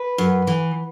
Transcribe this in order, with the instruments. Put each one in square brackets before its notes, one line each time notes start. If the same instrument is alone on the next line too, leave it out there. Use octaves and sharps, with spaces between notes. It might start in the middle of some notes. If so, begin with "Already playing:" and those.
Already playing: [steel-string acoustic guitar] B4
F#2
E3